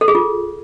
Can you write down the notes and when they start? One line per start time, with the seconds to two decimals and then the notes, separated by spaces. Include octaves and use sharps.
0.01 A4
0.08 G#4
0.15 F4